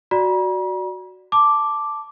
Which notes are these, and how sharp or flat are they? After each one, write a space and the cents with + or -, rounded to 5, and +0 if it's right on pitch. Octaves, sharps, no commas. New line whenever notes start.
F#4 +0 D5 +0 A#5 +45
A5 +0 D6 +0